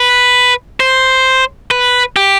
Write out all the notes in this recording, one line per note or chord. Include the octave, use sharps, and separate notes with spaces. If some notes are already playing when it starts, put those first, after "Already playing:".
Already playing: B4
C5
B4
G4